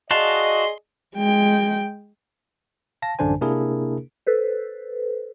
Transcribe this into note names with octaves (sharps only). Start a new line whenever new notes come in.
F#4 G#4 D5 D#5 F5 A5 C6
G#3 G5
F5 A5 A#6
A1 F#2 D3 D4 C5 G#5
C3 A#3 D4 E4 G#4 A#4
A4 B4 C5